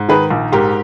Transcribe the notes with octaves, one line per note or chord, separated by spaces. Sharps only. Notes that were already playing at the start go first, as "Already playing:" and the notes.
Already playing: G#2
D#3 G#4 B4
A#1
G#2 G4 A#4